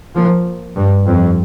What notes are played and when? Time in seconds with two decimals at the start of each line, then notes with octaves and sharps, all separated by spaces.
0.15 F3 A#3
0.76 G2
1.06 F2